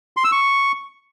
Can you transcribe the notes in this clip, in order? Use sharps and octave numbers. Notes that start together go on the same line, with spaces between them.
C6
E6
C#6